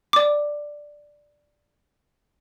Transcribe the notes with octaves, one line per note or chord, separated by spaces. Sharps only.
D5 D6